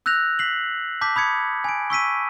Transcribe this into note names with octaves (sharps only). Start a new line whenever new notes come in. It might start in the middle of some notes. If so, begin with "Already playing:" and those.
E6 F#6 G6 A#6 F7
B6 C7 F#7
A5 D6 G6 B6
B5 D#6 G#6 C#7
G#5 D7
C#6 E6 B6 D#7